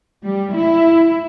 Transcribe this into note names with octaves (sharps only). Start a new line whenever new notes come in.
G3
E4